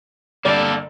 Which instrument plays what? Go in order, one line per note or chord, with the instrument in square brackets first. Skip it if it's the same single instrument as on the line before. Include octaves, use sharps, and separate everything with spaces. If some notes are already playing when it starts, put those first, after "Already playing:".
[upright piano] G1 D3 D5 [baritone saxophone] G3 [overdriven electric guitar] A#3 A4